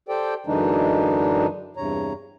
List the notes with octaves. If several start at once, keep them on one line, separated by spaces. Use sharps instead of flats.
G4 A4 C5 D5 G5
F#2 D3 E3 G#3 D4 D#4
E2 G2 C3 C#5 A#5